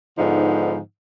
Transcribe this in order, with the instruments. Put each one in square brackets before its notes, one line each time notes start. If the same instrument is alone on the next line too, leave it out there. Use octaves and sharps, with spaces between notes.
[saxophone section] G#2 D3 F3 B3 D#4